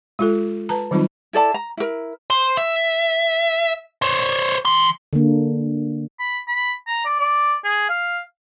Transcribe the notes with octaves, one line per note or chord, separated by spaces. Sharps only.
G#3 F4 A4
B4 A5 A#5
D#3 F#3 G3 C4 D#4 F4
E4 A4 D5 A5
A#5
E4 A#4
C5
E5
C5 C#5
E3 C6
D3 A#3
B5
B5
A#5
D5
D5
G#4
F5